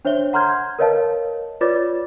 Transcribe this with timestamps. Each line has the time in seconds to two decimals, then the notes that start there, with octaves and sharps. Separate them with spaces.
0.05 D4 C5 C#5 E5 G7
0.33 F#5 A#5 C6 F6 G6 G#6
0.79 A#4 B4 C#5 D#5 F5 A5
1.61 F4 B4 C#5 D5 D6 A6